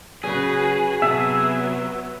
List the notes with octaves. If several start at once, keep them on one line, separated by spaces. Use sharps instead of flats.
C#3 F#3 F#4 G#4 B4
C3 F#3 B3 E5 A5